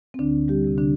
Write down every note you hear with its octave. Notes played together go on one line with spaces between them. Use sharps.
C4
D2 D3 D4
G3 G4
C3 G3
D3 D4